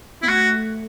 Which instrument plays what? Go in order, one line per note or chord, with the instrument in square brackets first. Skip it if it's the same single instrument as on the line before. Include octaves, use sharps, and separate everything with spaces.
[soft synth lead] B3 [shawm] E4
[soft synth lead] A3 [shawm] F#4